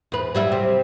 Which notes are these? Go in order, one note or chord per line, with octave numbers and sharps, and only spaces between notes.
E2 B4
F#3 G3 E4
C3